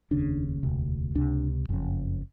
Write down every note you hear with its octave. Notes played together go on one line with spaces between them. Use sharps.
F1 D#2 C#3 D4
E1 D2 C3
C#2 C3 D4
F#1 F2 C#3